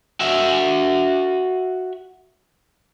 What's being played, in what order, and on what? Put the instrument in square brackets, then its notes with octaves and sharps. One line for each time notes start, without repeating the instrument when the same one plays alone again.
[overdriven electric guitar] F#4 E5